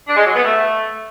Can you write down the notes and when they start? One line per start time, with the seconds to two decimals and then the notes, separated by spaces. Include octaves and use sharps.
0.07 D4
0.17 G#3
0.26 F#3
0.35 B3
0.45 A3